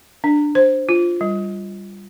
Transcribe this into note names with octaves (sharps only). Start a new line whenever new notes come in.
D4
C5
F4
G3